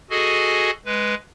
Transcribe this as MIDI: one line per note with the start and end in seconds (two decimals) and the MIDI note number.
0.10 0.71 66
0.10 0.71 68
0.10 0.71 69
0.10 0.71 75
0.10 0.71 80
0.85 1.14 56
0.85 1.14 71